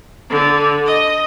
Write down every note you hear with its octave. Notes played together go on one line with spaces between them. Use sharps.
D3
D#5